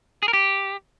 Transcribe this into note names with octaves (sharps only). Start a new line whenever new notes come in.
G#4
A#4
G4